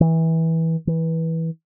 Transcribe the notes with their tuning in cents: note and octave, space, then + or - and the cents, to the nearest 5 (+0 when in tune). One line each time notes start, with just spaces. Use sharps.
E3 -20
E3 -15